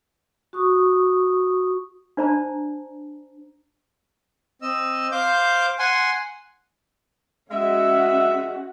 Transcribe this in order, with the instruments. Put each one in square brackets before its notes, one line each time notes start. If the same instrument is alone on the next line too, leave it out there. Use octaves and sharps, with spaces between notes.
[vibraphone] F#4 C#6 D#6
[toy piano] D4 C5 D5 A5 A#5
[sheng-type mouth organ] C4 D#5 E6
C5 F5 D6 G6
F#5 G#5 C6
[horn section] G#3 E5 [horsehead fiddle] C#4 F#4